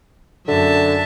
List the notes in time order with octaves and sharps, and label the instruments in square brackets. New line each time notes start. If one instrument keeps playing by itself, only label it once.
[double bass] F#2 [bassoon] D3 [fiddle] E5 A5